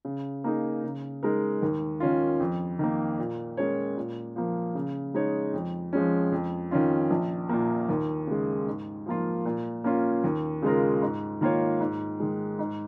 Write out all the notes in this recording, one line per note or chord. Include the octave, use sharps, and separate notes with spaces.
C#3
A#3 D#4 G#4
C#3
G#3 D#4 A#4
D#2
D#3 C#4 F4
F2
D#3 A#3
A#2
G#3 C#4 A#4 C#5
A#2
F3 A#3
C#3
G#3 D#4 C#5
F2
F3 G#3 C#4
F2
D#3 C#4 F4
A#1
A#2 A#3
D#2
C#3 G#3
G#2
F3 A#3 F4
A#2
A#3 C#4 F4
D#2
C#3 G#3 F4 A#4
G#2
D#3 A#3 F4 C#5
G#2
D#3 G#3
G#2